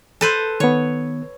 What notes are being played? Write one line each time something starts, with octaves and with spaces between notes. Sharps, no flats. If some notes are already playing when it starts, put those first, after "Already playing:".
A4 B4 C5
D#3 B3 C#5